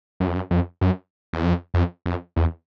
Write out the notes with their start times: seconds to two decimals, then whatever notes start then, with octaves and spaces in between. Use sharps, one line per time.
0.20 F#2
0.27 F2
0.35 F#2
0.51 F2
0.81 F#2
1.33 E2
1.44 F2
1.74 F2
2.06 F2
2.36 E2